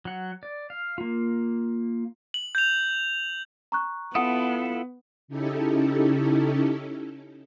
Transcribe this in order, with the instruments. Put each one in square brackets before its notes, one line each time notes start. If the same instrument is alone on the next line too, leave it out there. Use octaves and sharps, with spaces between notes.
[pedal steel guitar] F#3 F#5
D5
F5
A#3 F4
[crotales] F#7
G6 F7
[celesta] A#5 C#6 F#6
[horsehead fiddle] B3 [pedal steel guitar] E4 F4 A4 [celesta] F#5 D#6
[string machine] C#3 C#4 D#4 E4 G4 A4